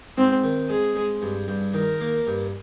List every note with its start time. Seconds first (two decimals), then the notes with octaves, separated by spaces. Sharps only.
0.17 G#2 C4
0.44 D#3
0.70 G#3 G#4
0.96 G#3
1.22 G2
1.48 G2
1.74 D#3 A#4
2.01 A#3
2.27 G2